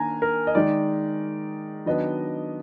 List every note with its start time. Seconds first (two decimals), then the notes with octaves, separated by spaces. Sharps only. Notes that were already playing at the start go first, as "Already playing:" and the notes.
Already playing: D#3 A#3 D4 G#5 A#5
0.22 A#4
0.47 D#5
0.55 D#3 G#3 D#4 D5
1.86 D#3 F#3 B3 D4 D#5